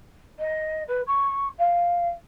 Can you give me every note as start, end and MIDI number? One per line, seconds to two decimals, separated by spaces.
0.39 0.83 75
0.88 1.01 71
1.07 1.48 85
1.58 2.08 77